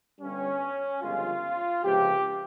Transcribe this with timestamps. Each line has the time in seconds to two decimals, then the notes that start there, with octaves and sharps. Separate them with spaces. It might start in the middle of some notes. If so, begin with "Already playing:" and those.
0.20 G1 G2 G3 C#4
1.02 G1 F2 C#3 G#3 F4
1.83 C#2 C3 F3 G4